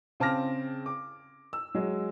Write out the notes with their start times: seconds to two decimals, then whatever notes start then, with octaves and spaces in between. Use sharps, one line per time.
0.20 C#3 C4 A5 D6 F6 A#6
0.86 D6
1.53 E6
1.75 F#3 G#3